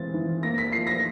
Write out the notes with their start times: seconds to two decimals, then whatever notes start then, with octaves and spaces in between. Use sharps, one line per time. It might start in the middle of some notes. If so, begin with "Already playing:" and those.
Already playing: E3 G#3 C4 A6
0.14 E3
0.43 A#3 A#6
0.58 B6
0.72 F3 C7
0.87 A#6